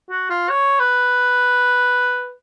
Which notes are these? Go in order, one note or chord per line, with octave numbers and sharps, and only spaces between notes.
F#4
F4
C#5
B4